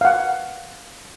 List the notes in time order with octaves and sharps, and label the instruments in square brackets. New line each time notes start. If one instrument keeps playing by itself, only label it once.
[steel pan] F5 F#5